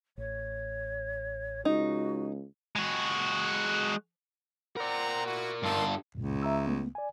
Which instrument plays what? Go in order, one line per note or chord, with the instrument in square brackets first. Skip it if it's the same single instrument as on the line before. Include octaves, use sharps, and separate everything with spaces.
[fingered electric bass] A1 [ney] C#5
[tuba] C#2 [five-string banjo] D#4 [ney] F#4
[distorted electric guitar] G#3 F#4
[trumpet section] C4 F#5 A#5 [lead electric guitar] A#4 D5
[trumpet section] E4 F#4
[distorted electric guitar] G2 A4 [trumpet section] D#4 A5 C6
[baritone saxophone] C#2 [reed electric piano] F#2 A#2
[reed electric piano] E5 A#5 E6
A3 B3
D5 G#5